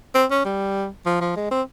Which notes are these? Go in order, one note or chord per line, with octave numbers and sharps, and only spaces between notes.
C4
C#4
G3
F3
F3
G#3
C4